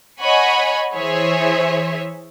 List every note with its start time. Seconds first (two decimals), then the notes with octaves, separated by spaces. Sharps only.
0.20 C#5 D#5 F#5 G#5 B5 C#6
0.93 E3 G#4 C5 C#5 E5